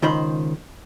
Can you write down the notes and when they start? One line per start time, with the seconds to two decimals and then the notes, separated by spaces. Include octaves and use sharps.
0.02 C#2 D#3 C5 B5